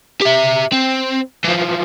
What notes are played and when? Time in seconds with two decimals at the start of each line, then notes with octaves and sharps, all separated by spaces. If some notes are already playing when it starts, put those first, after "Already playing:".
0.21 G4 E5
0.72 C4
1.44 E3 F3